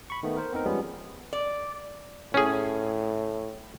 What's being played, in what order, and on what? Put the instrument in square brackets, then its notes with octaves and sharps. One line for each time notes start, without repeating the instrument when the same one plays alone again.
[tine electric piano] B5 C#6
D#3 A3 B3
A#4 C5
B3 C4 D#4 A#4
F3 G3 G#3 B3 C#4
[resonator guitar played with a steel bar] D5
[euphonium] A2 [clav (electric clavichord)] C#4 G#4